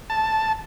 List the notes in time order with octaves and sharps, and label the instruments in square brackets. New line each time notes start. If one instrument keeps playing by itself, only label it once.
[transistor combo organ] A5